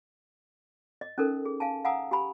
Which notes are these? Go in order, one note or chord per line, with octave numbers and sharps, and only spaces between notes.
D#5
C#4 D#4 A4 A#4
G#4
F5 G#5 A5
F5 F#5 G#5 A#5 D#6 E6
G4 G#5 B5